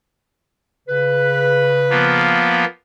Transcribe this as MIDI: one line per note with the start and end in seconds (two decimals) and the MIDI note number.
0.88 2.47 49
0.88 2.47 71
1.90 2.65 53
1.90 2.65 58
1.90 2.65 59